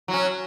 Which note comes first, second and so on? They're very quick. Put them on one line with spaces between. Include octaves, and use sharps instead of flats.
F#3 F#4 C#4